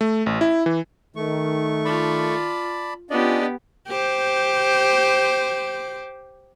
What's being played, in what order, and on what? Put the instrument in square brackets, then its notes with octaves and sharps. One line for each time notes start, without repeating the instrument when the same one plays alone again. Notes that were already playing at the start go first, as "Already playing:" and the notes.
[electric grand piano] A3
A1
E4
E3
[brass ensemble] D#3 [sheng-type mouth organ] A3 C#6
[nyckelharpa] F4 [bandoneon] D5 A5 B5
[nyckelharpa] B3 G4 [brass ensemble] C#4 F4 [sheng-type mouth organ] D4 D5 D#5
[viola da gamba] G4 C5